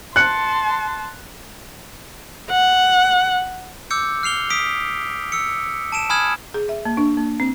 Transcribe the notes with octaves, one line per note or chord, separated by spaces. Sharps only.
A5 C6 F#6 C#7
F#5
D6 E6 G6 C#7
F6 C7 F7 G7
D#6 B6 D7
E6 C#7
A5 D7 E7
G#5 B5 D#6 F6 G#6 E7
G#4
E5
A#3
D4
A#3
C4